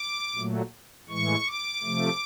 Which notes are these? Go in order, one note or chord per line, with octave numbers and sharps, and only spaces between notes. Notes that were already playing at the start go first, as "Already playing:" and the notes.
Already playing: D6
A#2 F#3 A3
A2 E3 G#3 C#6
D6
C3 F3 A3